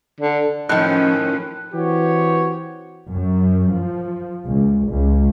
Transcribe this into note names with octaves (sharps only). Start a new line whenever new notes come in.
D3
A2 D#3 F3 C#4 F#6
E3 C4 F#4 G4 C#5
F#2
F3
C#2
C#2